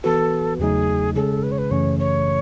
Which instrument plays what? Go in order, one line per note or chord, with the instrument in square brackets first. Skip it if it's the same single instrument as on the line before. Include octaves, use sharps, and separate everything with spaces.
[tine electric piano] E3 B3 F#4 B4 [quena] A4
[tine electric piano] E2 C#3 F#3 A3 D#4 [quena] G#4
[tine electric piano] C#3 G#3 C#4 G#4 [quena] A4
[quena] B4
C#5
B4
[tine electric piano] F#2 C#3 E3 A3 C#4 [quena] C#5
[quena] C#5